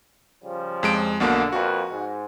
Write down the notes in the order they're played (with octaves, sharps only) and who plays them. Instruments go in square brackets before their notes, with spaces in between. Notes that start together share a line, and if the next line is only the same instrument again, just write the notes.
[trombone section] C#3 F3 G3
[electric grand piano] F2 G#3 D7
[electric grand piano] B1 B2 A#3 [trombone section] D3
[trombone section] F2 A#3 B4 [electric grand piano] F#4
[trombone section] G#2